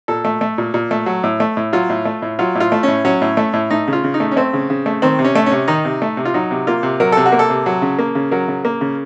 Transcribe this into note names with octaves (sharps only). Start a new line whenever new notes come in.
A#2 A4
A3
A3
A#2
A#2
A3
F#3
A2
A3
A2
F#3 F4
A2
A3
A2
F#3 F4
A2
F4
A3
A2 C#4
F#3 C#4
A2
A3
A2
A3 D#4
C#3
F4
C#3
D#4
A3
C#4
A3 C4
C#3
C#3
A3
D#3 C4
C3
C#4
A3
C#4
C3
D#3 D#4
C3
A3
C3
F4
F#3 D#4
C3
A#3 F4
C3
F#3 A#4
C3 A4
F#4
A#3
A4
C3
F#3
C#3
A#3
C#3
F#3 A#4
C#3
A#3
C#3